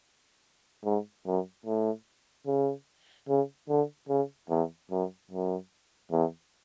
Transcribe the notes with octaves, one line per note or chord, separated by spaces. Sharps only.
G#2
F#2
A2
C#3
C#3
D3
C#3
E2
F#2
F#2
E2